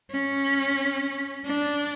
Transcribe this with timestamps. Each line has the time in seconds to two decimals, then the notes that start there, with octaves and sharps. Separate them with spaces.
0.12 C#4
1.46 D4